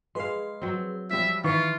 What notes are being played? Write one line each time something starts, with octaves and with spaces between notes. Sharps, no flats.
G#3 G#4 B4 F5 C6
F#3 C4
F3 G3 E5 B6
D#3 E3 F4 B4 C#6 C#7